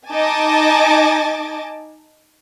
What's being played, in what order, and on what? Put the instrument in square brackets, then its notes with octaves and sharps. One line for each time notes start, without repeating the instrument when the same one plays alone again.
[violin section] D#4 D#5 G#5 A5 D6 A6